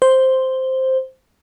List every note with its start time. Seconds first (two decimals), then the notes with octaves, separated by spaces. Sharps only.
0.02 C5